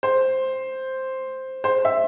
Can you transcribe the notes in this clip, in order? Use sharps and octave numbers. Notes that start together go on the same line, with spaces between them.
C5
C5
E5